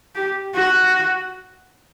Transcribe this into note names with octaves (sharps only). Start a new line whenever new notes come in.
G4
F#4